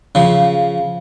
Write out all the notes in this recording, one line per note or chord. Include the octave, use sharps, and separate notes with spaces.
C#3 F3